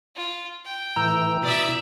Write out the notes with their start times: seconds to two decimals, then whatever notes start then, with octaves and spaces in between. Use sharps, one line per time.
0.16 F4
0.65 G5
0.96 A2 E3 A#5 E6 G6
1.43 B2 E4 D5 E5 D#6